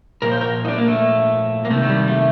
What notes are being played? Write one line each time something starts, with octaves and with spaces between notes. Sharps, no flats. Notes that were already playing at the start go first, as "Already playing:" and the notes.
A#2 F3 A#4
C5
A#4
D#4
D4
A#3
A3
A#3
C3 D#3 A3
A3
G3
A3